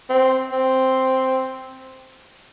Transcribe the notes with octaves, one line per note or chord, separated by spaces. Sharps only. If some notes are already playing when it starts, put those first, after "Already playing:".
C4
C4